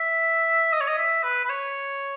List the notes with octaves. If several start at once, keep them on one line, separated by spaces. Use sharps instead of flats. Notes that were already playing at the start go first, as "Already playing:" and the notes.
Already playing: E5
D#5
C#5
D#5
E5
B4
B4
C#5